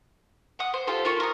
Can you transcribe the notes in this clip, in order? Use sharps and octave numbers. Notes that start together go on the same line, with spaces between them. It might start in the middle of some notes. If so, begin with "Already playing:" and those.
F#5 D#6
C5
F4 G4 A4 C5
A#3 F4 A#4 C#6
A#4 D#6